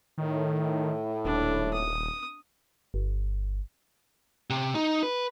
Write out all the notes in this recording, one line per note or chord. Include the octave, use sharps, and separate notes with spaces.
A2 D#3
D#1 D4
D#6
G1
C3
D#4
B4